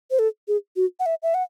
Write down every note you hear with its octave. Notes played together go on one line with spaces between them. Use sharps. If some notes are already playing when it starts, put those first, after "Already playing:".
C5
A4
G#4
F#4
F#5
E5
E5
F#5